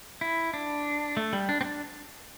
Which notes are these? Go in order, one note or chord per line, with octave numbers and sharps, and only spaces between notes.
E4
D4
A3
G3
D4
C4
D4